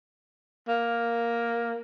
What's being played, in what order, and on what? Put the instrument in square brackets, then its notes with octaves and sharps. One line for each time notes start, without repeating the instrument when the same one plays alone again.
[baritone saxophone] A#3